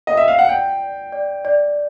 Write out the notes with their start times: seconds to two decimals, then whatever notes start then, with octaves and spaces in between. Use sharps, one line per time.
0.07 D#5
0.17 E5
0.28 F5
0.39 F#5
0.49 D5 G5
0.81 D5
1.12 D5
1.45 D5